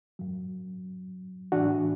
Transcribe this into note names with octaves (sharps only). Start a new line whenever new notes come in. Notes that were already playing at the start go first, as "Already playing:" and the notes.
F#2 F#3
A2 E3 D4 F#4